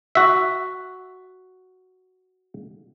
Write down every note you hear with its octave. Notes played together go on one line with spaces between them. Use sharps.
F#4 E5